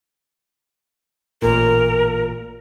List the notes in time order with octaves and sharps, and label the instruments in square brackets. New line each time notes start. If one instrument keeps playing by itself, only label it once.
[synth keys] A1 A#2 [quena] A#4